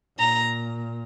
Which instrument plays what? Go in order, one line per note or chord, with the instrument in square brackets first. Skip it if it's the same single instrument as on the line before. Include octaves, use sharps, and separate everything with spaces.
[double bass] A#2 [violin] A#5